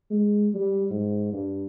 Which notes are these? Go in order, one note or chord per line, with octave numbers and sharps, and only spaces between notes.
G#3
G3
G#2
G2